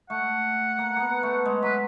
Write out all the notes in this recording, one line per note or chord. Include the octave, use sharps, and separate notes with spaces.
A3 F#5
A#3
A#3 B3
A3
G#3
F#3 B4